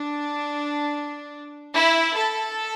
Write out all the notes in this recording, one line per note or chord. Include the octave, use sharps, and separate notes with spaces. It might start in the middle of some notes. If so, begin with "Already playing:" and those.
Already playing: D4
E4
A4